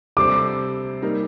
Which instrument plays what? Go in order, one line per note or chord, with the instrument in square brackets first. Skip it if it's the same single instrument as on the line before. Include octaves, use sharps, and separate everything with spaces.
[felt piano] C3 G3 D4 A4 C5 [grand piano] D6
[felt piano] G3 A#3 D#4 A#4